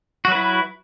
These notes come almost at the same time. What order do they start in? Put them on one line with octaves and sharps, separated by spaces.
F#4 F#3 B4 E4